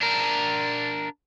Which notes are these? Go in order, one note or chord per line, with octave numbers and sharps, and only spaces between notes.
D4 A#4